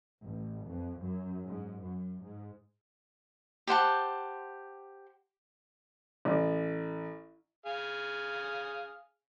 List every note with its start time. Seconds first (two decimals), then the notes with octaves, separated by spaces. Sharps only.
0.24 A1
0.68 F2
1.02 F#2
1.46 G#2
1.81 F#2
2.23 G#2
3.67 G4 C5 F#5 A5
6.25 A1
7.66 G#4 F5